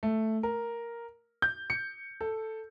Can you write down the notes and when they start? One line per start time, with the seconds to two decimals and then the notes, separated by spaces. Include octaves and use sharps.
0.03 A3
0.43 A#4
1.42 G6
1.70 C#7
2.21 A4